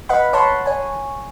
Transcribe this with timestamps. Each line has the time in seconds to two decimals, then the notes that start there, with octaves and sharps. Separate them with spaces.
0.09 B4 D#5 F5 F#5 B5
0.33 C#5 F#5 A5 B5 C6
0.66 C#5 G#5